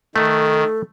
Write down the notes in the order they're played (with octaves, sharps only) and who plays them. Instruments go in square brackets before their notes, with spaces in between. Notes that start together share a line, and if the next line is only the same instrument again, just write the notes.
[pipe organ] D#3 [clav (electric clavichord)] A3 [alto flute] A4